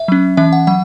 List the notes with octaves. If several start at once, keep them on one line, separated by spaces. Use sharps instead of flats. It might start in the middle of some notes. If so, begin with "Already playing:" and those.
Already playing: E5
F#3 C#4
E3 C#4 E5
F#5
F#3 F#5